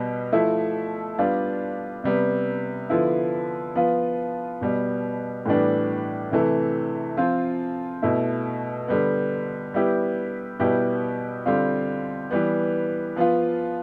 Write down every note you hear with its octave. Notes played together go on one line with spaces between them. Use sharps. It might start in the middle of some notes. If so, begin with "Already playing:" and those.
Already playing: B2 G3 B3
F3 A3 E4
G3 B3 D4 F4
C3 G3 B3
D3 F3 B3 E4
F3 B3 F4
B2 G3 B3
A2 E3 G3 B3 D4
C3 E3 A3
F3 C4 F4
B2 A3 E4
D3 G3 B3
G3 B3 E4 G4
B2 G3 B3 E4 G4
D3 G3 C4 F4
E3 G3 B3
F3 B3 F4